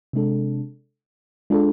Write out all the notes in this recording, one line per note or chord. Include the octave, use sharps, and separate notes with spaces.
C3 G#3 D4 A4
G#3 D4 F4 A4